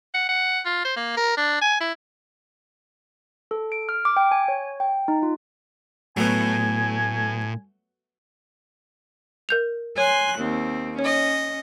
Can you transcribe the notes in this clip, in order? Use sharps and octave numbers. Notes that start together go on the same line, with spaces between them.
F#5
F#5
F4
C5
A#3
A#4
D4
G#5
E4
A4
D7
F6
D6
G5
G#5
C#5
G5
D#4
F4
A2 F#3 A3 B3 G#5
A#4 G6 F7
C#5 G#5 C6 F#6
D#2 C4
C#4 C#5 D#5